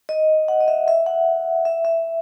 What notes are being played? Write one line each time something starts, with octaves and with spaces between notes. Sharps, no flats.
D#5
F#5
D#5
E5
E5
F#5
E5
E5